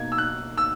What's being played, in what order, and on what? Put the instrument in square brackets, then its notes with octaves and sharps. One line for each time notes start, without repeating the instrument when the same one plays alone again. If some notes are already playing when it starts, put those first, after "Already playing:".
Already playing: [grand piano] B2 A#3 D#4 G#6
E6
F#6
E6